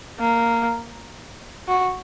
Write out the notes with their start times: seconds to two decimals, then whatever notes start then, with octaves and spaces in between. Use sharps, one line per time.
0.19 A#3
1.68 F#4